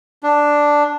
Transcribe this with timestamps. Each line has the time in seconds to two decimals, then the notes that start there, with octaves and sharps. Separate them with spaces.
0.23 D4